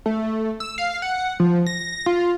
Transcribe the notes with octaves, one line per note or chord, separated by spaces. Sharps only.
A3
E6
F5
F#5
F3
A#6
F4